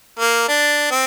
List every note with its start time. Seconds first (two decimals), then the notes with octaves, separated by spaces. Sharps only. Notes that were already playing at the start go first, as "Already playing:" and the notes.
0.20 A#3
0.48 D4
0.91 C4